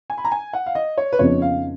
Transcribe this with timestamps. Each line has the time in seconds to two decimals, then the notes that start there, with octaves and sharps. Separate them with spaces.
0.10 G#5
0.18 B5
0.25 A#5
0.32 G#5
0.53 F#5
0.66 F5
0.75 D#5
0.98 C#5
1.13 B4
1.19 F2 C#3 F3 B3 D#4 C#5
1.42 F5